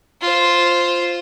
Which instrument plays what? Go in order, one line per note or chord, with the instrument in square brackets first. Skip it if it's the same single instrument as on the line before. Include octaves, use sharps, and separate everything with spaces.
[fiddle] F4 C5